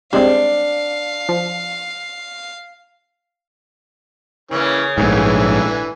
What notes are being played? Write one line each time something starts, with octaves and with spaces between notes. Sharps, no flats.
G3 G#3 C4 D4 F5
F3
C#3 E3 A#3 C#4
A#1 G#2 D3 E3 G#5